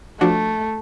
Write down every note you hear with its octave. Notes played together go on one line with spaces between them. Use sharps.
F3 A3 D4 F#4